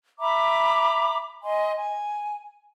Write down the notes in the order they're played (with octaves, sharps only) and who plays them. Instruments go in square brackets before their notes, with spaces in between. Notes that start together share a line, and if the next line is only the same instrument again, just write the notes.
[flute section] E5 A#5 B5 D6
D#5 G#5 C6
G#5